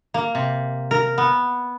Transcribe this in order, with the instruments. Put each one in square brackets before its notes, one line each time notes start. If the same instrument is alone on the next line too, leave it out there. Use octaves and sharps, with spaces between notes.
[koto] A#3
C3
A#4
B3